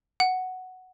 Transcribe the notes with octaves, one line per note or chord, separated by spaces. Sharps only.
F#5